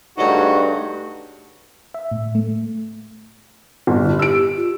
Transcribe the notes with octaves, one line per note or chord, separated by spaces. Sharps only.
G2 C#3 A3 D#4 F#4 C#5
E5
A2
A3
G1
E4
G4 E6 D7
F4